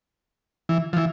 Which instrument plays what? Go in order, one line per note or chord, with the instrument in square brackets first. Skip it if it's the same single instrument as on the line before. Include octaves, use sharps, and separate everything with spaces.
[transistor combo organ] E3
F3
E3